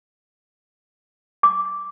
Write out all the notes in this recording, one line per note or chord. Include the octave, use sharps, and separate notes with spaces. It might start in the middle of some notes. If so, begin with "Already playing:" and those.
D6